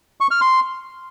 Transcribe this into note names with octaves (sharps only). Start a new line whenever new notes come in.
C#6
F6
C6